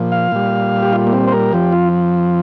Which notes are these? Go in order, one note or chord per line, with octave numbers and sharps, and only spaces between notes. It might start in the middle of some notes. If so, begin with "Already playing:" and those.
Already playing: A#2 F3
F5
A#2 G3
G4
F4
A#3
C4
C5
A#4
F2 F3 G4
F4